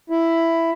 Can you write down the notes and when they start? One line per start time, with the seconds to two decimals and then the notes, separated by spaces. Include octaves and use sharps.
0.10 E4